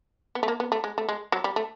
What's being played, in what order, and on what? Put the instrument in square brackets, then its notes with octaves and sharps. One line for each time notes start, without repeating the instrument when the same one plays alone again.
[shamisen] B3
A3
A#3
B3
A3
G#3
A3
G#3
F#3
G3
A3